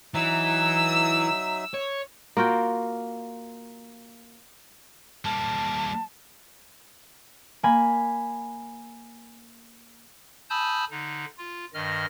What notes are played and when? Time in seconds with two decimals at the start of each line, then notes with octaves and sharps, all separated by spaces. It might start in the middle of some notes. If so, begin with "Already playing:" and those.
0.14 E3 F#3 D#4 E5 E6
1.74 C#5
2.37 A#3 F4 F#4 G5
5.25 G3 A#3 A5
7.63 A#3 G#5 B5
10.50 G#5 A5 B5 D#6 E6 G6
10.91 D3 D#4
11.38 F4
11.74 G2 D#3 D#5 F6